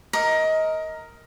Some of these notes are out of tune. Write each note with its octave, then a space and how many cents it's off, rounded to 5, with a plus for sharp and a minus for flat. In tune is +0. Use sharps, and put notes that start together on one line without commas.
A#4 +0 D#5 +20